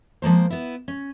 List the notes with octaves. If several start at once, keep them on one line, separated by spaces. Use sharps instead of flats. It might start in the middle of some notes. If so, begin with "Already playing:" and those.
F3 G#3 A#3 C5
B3 E4
C#4